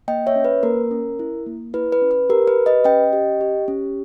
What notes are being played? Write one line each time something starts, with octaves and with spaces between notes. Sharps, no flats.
A#3 D#5 G5
C#5 E5
C#4
B4
A#3 A#4
C#4
E4
A#3
E4 B4
B4
C#4
B4
G4 A#4
B4
G4
B4 D#5
C#4 D#5 G5
G4
G4
C#4